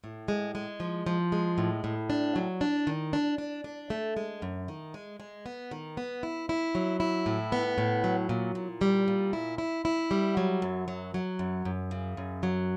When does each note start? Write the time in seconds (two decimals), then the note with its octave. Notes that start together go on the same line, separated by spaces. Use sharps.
0.04 A2
0.28 G#3
0.55 G#3
0.80 F3
1.06 F3
1.32 G#3
1.58 A2
1.84 A2
2.10 D4
2.36 F#3
2.61 D4
2.87 D#3
3.13 D4
3.38 D4
3.64 D4
3.90 A3
4.17 G#3
4.42 F#2
4.68 D#3
4.94 G#3
5.20 G#3
5.46 B3
5.71 D#3
5.97 B3
6.23 E4
6.49 E4
6.75 F#3
7.00 E4
7.26 A2
7.52 B3
7.78 A2
8.04 F#3
8.29 A#2
8.55 A#2
8.81 G3
9.08 A#2
9.33 E4
9.58 E4
9.85 E4
10.11 G3
10.37 F#3
10.62 F#2
10.88 F#3
11.14 F#3
11.39 F#2
11.65 F#2
11.91 C#3
12.17 F#2
12.43 F#3